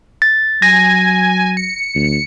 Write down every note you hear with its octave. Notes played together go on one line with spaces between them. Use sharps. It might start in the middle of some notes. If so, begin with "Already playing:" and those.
A6
F#3 G#5 A#6
C#7
D2